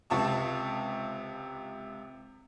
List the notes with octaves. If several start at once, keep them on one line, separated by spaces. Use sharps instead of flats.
C#2 C3 A5 C#6